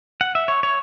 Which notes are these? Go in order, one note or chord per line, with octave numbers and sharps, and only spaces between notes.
F#5
E5
C#5
C#5